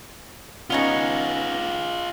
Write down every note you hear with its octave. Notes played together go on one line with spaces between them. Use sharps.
B3 C#4 D#4 F4 G#4